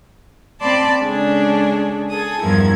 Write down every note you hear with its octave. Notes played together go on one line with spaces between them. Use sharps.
C4 D5 A5 B5 C6
C#3 G#3 D4 G#4 A4
G#4 A4 D#6
E2 G2 F3 E4 A#4 G#6